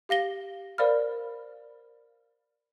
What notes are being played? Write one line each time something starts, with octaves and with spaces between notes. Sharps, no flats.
G4 F5 A#6 G7
A#4 C5 D5 F5 B5 F6